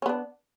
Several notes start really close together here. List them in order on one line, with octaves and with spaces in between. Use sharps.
C#4 B3 D4